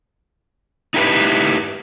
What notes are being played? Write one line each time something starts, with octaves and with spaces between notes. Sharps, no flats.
D#4 E4 G4 A#4 B4